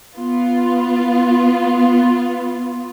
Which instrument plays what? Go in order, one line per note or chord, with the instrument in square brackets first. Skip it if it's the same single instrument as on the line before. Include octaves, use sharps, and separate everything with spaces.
[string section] B3 F4